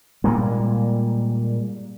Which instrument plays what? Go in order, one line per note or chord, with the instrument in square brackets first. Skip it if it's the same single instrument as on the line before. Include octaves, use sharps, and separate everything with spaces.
[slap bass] A#2 G3 G#3 A#3